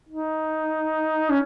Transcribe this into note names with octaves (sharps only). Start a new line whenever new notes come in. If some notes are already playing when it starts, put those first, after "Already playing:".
D#4
C#4